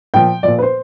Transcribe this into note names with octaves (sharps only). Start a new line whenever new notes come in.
A#2 F3 G5
A#2 F3 D5
B4
C5